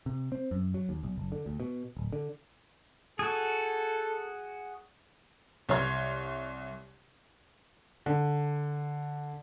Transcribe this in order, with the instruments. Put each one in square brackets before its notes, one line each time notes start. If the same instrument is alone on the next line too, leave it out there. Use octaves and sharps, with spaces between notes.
[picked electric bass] C3
C4
F#2
F#3
D#2
B1
F#1
D3
D2
B2
D1
D3
[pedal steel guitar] F#4 G#4 [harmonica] A4
[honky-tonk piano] C2 C#5 C6 G#6
[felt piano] D3